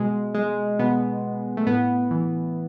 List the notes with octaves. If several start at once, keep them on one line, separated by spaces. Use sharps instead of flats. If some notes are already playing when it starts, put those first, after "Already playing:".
Already playing: B2 G#3
G#3
B2 B3
A3
A2 B3
E3